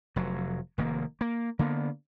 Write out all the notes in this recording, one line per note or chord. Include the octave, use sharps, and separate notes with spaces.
F1 F#3
F1 D#3 A#3
A#3
D3 A#3 B3